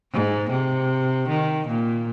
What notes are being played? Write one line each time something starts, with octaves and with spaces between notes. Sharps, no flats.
G#2
C3
D#3
A#2